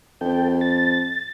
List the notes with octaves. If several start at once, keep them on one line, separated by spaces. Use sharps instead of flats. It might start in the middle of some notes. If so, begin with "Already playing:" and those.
F2 A4 G5
A6